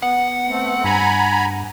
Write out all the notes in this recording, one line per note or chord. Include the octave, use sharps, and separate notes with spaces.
B3 F#5
A3 C4
G2 G#5 A#5 B5